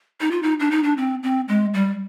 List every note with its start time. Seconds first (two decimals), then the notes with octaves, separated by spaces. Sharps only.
0.20 D#4
0.31 F4
0.42 D#4
0.59 D4
0.71 D#4
0.83 D4
0.97 C4
1.23 C4
1.48 G#3
1.74 G3